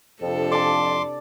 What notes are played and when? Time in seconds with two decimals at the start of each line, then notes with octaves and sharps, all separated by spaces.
0.22 F2 C3 D4 A4
0.52 D5 A5 C6 D6